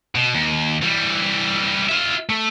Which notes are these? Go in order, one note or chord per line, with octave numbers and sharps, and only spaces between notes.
B2
D#2
E3 G3
F4 E5
A3